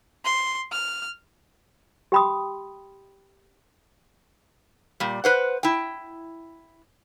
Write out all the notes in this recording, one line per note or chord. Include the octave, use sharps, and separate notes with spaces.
C6
F6
G4 G5 B5 C6 D#6
A#2 G3
B4 C5 F#5
E4 G5